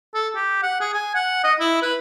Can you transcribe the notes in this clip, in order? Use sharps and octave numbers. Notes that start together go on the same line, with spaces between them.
A4
G4
F#5
G#4
G#5
F#5
D#5
E4
B4